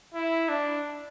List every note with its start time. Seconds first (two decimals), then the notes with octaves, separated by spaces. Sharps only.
0.15 E4
0.49 D4